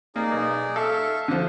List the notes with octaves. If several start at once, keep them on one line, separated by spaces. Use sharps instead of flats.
A#3 D#4 G#4 D5
B1
A4 E5 F5 C#6
D3 F3